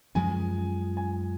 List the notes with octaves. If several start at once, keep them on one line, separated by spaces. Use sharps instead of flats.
F#2 F3 G#3 C#4 G#5
G#5